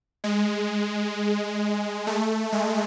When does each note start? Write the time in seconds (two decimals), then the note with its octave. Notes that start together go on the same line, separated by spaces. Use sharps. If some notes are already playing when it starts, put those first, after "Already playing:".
0.24 G#3
2.07 A3
2.52 G#3